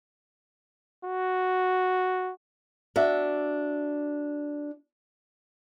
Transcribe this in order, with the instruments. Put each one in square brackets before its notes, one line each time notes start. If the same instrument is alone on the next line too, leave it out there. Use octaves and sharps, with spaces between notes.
[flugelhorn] F#4
[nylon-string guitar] D4 F#4 E5